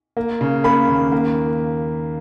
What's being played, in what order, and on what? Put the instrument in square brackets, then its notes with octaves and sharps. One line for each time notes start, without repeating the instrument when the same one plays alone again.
[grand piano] A#3
C#3
A#3 B5
D#2
A#3